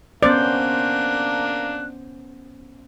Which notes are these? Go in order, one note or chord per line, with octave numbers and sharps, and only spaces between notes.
A#3 B3 C#4 D4 C5 D5 F#6